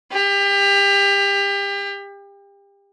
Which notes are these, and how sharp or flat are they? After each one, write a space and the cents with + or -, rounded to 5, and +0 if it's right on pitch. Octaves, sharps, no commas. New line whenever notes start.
G4 +30